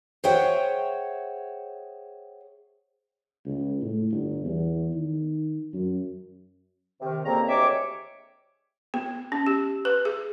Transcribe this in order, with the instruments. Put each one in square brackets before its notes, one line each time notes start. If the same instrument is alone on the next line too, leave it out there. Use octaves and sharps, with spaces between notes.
[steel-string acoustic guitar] G#4 C5 C#5 E5 F#5 G5
[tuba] C#2
A2
G1
E2
D#3
F#2
[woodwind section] C3 D#3
F2 A#2 C#3 A#3 C4 A#5
D2 G#3 G4 C#5 E5 D6
[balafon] B3
C#4
G4
B4
G#4